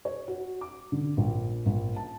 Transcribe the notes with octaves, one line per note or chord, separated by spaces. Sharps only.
C#5
F#4
D6
D3
A#1
A#1
A5